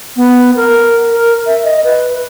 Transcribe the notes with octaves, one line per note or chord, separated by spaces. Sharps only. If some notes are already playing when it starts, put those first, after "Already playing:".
B3
A#4
A#4
E5
D#5
B4